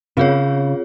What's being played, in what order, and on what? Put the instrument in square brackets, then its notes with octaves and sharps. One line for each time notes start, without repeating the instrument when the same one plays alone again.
[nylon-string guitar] C#3 [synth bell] C4 F4 G#4 C#5